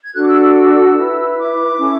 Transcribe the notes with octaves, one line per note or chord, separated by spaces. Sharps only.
G#6
D4 F#4 A4 F#6
D6
E6
E6
E6
E4 B4
D6
C#4 E4 A4